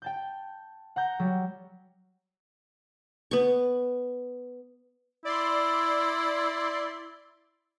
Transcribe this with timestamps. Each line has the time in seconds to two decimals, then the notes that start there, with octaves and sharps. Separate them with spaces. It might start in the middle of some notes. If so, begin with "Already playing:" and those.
0.02 G5 A5 G6
0.96 F#5 A#5 G6
1.19 F#3 G3
3.31 B3 C#6
5.25 E4 D5 C6